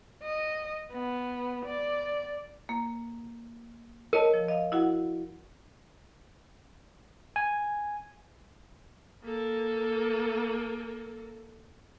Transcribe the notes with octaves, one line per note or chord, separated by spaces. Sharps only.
D#5
B3
D5
A#3
A#4 C#5 D#5 A5
F3
D#5 F5
E4 F#4 F#5
G#5
A#3 A4